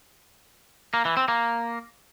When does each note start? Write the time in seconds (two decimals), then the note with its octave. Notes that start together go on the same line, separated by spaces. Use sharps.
0.94 A#3
1.05 E3
1.17 C4
1.28 A#3